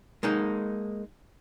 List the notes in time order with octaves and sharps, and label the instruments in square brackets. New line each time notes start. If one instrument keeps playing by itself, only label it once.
[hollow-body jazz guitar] G#3 A#3 D#4